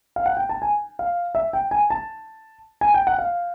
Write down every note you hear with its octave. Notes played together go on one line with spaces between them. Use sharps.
F5
F#5
G5
A5
G#5
F5
E5
G5
G#5
A5
G#5
G5
F#5
F5